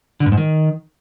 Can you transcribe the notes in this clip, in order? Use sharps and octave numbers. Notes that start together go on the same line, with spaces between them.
D3
G2
G#2
D#3